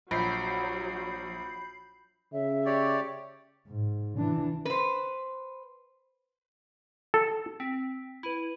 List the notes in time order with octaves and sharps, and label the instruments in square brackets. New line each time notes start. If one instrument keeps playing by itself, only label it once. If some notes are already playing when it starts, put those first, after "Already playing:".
[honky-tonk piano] A#1 [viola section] F#3 [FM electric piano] B5 G6 C7
[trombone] C#3 [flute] E5
[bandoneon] G4 C#5 D5
[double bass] G#2
E3 D4
[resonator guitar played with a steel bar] B4 C5
[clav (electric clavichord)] A4
[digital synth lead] C4 [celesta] B6
[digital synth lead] E4 [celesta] B4 D#7 F#7